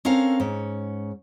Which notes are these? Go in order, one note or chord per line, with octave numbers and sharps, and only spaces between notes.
C4 C#4 A4 A#4 F5
G#2 C#4